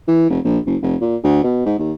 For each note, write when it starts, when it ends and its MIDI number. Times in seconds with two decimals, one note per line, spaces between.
0.08 0.29 52
0.30 0.39 29
0.44 0.58 34
0.66 0.77 30
0.82 0.96 29
1.01 1.16 46
1.24 1.41 38
1.43 1.61 47
1.66 1.75 44
1.78 1.93 39